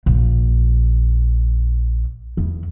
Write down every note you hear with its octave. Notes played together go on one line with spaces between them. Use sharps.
A#1
E2